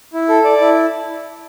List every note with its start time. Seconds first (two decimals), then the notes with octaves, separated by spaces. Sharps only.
0.14 E4
0.29 A4
0.44 D5
0.61 E4